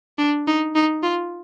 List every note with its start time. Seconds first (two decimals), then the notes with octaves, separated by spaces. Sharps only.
0.18 D4
0.47 D#4
0.75 D#4
1.03 F4